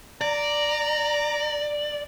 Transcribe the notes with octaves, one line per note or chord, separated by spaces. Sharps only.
D5 A#5